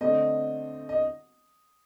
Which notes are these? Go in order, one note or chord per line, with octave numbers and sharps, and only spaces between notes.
D3 A3 C4 D#5
D#5